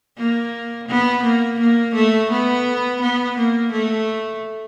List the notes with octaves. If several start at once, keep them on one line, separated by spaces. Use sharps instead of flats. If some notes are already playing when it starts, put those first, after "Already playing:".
A#3
B3
A#3
A#3
A3
B3
B3
A#3
A3